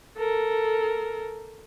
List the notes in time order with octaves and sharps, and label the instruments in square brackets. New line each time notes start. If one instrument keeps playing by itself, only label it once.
[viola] A4 A#4